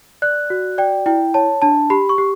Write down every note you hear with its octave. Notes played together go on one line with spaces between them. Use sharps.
D5 F#6
F#4
D5 G5
E4 G5
C#5 A5
D4 A5
G4 B5
C#6
G4